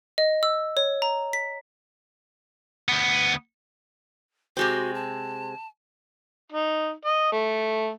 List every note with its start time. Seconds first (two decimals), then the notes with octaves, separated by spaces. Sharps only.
0.18 D#5
0.43 E6
0.77 C#5
1.02 A#5
1.33 B6
2.88 D2 B3
4.57 C3 G#3 C4 F#4
4.94 A5
6.52 D#4
7.05 D#5
7.32 A3